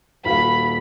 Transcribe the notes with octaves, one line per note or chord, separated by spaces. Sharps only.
D#1 F#4 F5 B5